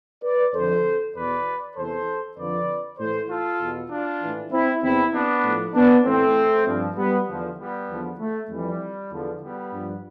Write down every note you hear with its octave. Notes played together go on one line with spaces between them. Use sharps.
B4 D5
F2 D3 F3 A4 C5
E2 B2 B4 D5
E2 C3 E3 A4 C5
F2 D3 F3 B4 D5
A2 E3 A4 C5
F4 A4
E2 B2
D4 F4
A2 E3
C4 E4
E2 C3 E3 C4 E4
B3 D4
A2 F3
B3 D4
A2 E3 A3 C4
G2 F3
G3 B3
E2 D3 F3
G3 B3
E2 D3 F3
A3
F2 E3 G3
E2 D3 F3
G3 B3
G2 F3